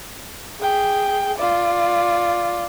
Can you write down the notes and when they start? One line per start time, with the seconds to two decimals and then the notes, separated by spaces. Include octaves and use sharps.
0.60 G#4 G5
1.37 F4 D5